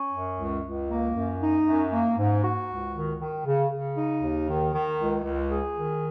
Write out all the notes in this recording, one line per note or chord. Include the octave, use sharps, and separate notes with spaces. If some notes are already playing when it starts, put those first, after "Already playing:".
Already playing: C#4
F#2
C#2
C#2
A#3
F#2
D#4
F#2
A#3
G#2
F#4
C#2
D#3
D#3
C#3
C#3
D#4
D#2
D#3
D#3
C#2
C#2
G#4
D#3